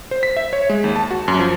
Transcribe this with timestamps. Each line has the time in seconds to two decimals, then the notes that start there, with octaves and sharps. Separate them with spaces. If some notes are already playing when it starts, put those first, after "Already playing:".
0.11 C5
0.23 B6
0.37 E5
0.53 C#5
0.69 G#3
0.84 D#2
0.96 A5
1.11 F#4
1.28 F#2
1.39 F3